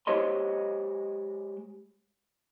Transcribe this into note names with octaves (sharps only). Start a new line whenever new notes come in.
G#3 G4 C5 C#5 D#5 C6